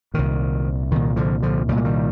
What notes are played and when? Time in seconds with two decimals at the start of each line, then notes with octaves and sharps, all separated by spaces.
0.14 C2 A#2 D#3
0.91 C2 A#2 D#3
1.16 D3 F3
1.43 D3 F3
1.68 C2 G3
1.72 A#2
1.77 G#3
1.85 D#3 G3